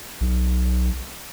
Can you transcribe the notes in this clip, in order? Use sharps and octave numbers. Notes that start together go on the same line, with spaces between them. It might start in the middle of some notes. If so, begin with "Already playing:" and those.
B1